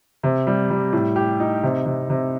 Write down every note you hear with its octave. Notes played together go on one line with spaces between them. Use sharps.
C3
G3
G3
A2
G4
D#4
C3
C3
C3